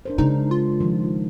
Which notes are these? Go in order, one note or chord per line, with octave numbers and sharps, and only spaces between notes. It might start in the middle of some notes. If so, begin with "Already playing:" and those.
D4 A#4 C5
C#3 G#3 D#4
F4
D#3 F3